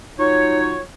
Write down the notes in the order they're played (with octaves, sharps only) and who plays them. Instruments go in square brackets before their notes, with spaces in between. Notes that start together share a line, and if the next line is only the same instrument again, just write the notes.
[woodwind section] F#3 D#4 F4 C#5